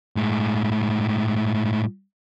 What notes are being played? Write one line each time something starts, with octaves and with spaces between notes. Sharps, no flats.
A2 G#3